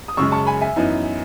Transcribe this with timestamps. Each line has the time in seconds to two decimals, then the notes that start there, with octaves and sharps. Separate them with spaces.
0.08 D#6
0.17 F#2 C#3 G#3 C#6 E6
0.32 A5 C#6
0.47 G#5 B5
0.61 E5 G#5
0.76 F#2 E3 B3 D#4